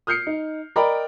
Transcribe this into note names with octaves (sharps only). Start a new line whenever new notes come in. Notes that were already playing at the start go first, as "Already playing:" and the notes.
D#6 F6 G6 C7 C#7
D#4
A#4 D5 D#5 G5 A#5 B5